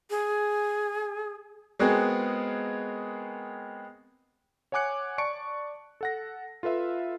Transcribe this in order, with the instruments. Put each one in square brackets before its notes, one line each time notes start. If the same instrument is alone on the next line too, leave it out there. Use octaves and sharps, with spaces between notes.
[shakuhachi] G#4
[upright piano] G#3 B3 C4 F#4 G#4 A#4
[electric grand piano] C#5 F#5 G#5 D6 F#6 C#7
D5 A5 C#6 C#7 D7
A4 F#5 A#6
F4 A4 B4 E5 F5